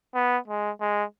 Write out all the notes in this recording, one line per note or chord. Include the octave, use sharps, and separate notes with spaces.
B3
G#3
G#3